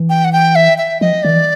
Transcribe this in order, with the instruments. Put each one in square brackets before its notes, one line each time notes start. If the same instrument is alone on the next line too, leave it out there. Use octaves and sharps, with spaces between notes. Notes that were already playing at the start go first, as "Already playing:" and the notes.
Already playing: [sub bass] E3
[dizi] G5
F#5
G5
E5
E5
[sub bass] F3 [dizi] D#5
[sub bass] D#3 [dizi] D5
[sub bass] E3